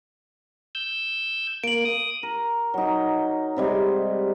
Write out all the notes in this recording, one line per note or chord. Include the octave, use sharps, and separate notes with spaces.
E6 G6
A#3 D7 F#7
D#6
A#4
F#3 D#4
C3 G3 G#3